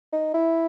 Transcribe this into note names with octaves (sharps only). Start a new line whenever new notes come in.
D#4
E4